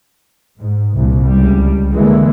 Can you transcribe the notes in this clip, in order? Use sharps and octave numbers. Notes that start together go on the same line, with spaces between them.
G#2
C2 A#2
C#2 G3
D3 E3 G#3 A#3